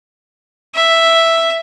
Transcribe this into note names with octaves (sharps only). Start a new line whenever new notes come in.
E5